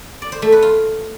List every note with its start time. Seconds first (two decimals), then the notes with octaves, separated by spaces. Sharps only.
0.22 D5
0.32 C5
0.42 A3
0.52 B4
0.62 F4